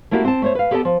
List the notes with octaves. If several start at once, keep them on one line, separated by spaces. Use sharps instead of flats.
A3 A#3 D4 E4 F#4 G4
C4 A5
A3 C5 C#5
B4 F5
B3 G4 A4 C#5 D#5 A5
F3